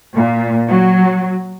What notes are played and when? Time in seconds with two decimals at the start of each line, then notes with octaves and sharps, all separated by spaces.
0.14 A#2
0.69 F#3